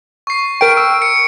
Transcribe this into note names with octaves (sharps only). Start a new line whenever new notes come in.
C#6 C7
A#4 G5 D7
E6
C#7